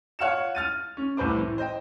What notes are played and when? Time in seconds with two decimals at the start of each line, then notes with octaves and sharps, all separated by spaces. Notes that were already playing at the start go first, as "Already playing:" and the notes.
0.19 F4 C#5 F#5 F6 C#7 E7
0.55 F6 A6 D#7
0.97 C#4
1.17 C2 A2 B4 C5 D6
1.37 E3
1.58 C5 D#5 G5